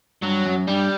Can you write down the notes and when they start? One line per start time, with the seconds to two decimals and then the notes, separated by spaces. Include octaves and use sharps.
0.23 G2 F#3
0.46 F#2
0.68 G2 G3